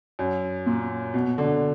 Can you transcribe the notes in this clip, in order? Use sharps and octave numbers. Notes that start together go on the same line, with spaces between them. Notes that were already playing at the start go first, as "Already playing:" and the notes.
F#2
A#2
B2
D3